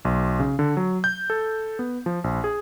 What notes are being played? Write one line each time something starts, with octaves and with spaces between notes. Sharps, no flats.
B1
C#3
D3
F#3
G6
A4
B3
F3
A#1
G#4